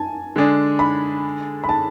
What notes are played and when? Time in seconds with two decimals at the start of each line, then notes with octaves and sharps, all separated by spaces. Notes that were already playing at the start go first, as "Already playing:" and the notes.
Already playing: G#5 A5
0.36 D3 G#3 D4 G#4
0.79 B5
1.64 B5
1.69 A5